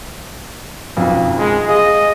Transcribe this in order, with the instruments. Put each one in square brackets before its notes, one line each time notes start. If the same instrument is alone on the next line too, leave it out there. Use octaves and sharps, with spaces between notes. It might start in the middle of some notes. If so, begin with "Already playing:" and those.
[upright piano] F#1 B1 F2
[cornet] G#3
[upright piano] G#4 F5 [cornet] D#5